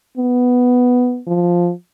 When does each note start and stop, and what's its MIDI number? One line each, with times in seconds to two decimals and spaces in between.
0.17 1.20 59
1.27 1.71 53